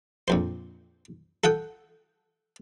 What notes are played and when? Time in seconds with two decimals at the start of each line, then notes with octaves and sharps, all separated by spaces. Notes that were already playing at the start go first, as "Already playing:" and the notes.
0.28 A#1 F2 C5
1.44 A4 F#5 G5 D#6